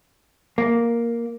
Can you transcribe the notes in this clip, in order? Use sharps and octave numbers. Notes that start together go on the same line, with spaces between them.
A#3